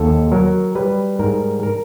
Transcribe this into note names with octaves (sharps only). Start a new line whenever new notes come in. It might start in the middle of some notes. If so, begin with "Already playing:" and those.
Already playing: D#2 A4
F#3 A#4
G3 B4
G#2 A#4
A#4